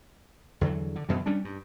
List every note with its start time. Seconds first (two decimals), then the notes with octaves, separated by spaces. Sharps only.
0.61 E2 D3 E3 F#3
0.96 D3
1.09 F#2 B2 E3
1.26 G3 C#4 D4
1.45 G2